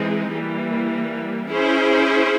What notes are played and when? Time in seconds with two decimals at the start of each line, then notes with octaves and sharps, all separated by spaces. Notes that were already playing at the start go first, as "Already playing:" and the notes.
Already playing: E3 G#3 C4 D#4 G#4
0.33 E3 G3 A#3
1.48 C#4 E4 G#4 C5